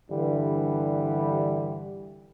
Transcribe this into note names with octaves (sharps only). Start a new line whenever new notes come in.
G2 D3 E3 G3